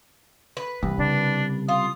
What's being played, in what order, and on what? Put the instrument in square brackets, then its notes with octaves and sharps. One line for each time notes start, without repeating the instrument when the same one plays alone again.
[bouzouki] B4
[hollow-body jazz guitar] C2 [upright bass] E3
[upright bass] C#3 [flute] D4
[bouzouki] F4 [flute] D#6